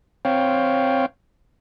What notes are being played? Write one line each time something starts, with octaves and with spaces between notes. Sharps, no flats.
C4 C#5 F5 G5